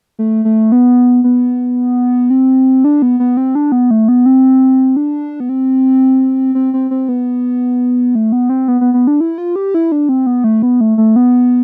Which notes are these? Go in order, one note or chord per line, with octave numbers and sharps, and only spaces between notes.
A3
A3
B3
B3
C4
D4
B3
B3
C4
D4
B3
A3
B3
C4
D4
B3
C4
C4
C4
C4
B3
A3
B3
C4
B3
B3
B3
D4
E4
F4
G4
E4
D4
C4
B3
A3
B3
A3
A3
B3